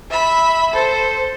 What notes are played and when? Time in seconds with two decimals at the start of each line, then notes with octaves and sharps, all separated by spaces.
0.10 E5 B5
0.73 A4 C5